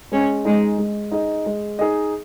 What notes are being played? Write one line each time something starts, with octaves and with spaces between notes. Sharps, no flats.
G#3 C#4
G#3 D#4 G#4 D#5
G#3
D#4 G#4 D#5
G#3
D#4 G#4 D#5